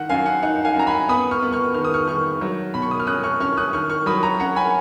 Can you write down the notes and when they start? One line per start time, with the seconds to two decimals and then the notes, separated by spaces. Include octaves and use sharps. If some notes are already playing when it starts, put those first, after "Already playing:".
Already playing: D#3 F#5
0.09 F#2 F5 G#5
0.26 F#5
0.43 D#4 F#5
0.64 F5 G#5
0.76 F#2 A#5
0.87 G#5 B5
1.08 B3 B5 D#6
1.31 C#6 F6
1.42 B3
1.52 C#6 F6
1.74 D#3 F6
1.85 D#6
1.94 C#6 F6
2.08 D#3 C#6 F6
2.41 F#3
2.74 B2 B5
2.82 C#6
2.91 D#6
3.00 F6
3.07 C#4 D#6 F#6
3.23 C#6 F6
3.40 C#4 C#6 F6
3.57 D#6 F#6
3.73 D#3 C#6 F6
3.90 C#6 F6
4.06 F#3 B5 D#6
4.23 A#5 C#6
4.40 C#4 F#5 A#5
4.56 G#5 B5